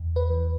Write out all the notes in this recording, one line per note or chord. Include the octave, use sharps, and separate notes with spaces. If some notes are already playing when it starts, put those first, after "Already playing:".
Already playing: E2
B4
E3